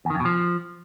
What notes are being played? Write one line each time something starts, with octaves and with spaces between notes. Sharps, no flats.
E2
D#3
F2
B2
F3